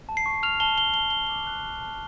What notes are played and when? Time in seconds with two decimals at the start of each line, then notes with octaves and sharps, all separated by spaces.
0.09 A5
0.17 C7
0.26 C#6
0.43 F6 F7
0.60 A5 G7
0.78 A5 G7
0.94 A5 G7
1.10 A5 G7
1.27 D6 G7
1.47 F#6
1.64 A5
1.81 A5